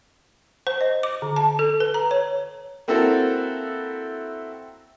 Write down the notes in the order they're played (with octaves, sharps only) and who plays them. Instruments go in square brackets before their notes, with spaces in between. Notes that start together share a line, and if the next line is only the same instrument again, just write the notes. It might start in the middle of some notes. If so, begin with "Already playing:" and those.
[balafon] C5
D#5
D6
D3
A5
A4
B4
A#5
C#5
[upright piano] A#3 C4 E4 F#4 A4